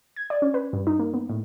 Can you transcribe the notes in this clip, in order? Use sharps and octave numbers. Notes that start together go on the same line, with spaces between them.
G#6
D5
C#4
B4
G2
D#4
A#3
B3
A2